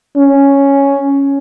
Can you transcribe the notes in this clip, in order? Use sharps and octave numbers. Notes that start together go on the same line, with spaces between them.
C#4